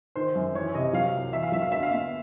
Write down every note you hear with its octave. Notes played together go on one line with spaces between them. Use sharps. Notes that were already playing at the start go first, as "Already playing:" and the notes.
D#3 C5
F#2
E3 C#5
C3 D#5
F#3 F5
C2
E2 E5
F5
F#3 E5
F5
D3 E5
F5
B3 E5